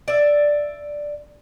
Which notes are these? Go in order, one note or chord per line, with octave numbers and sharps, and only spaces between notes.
D5 E5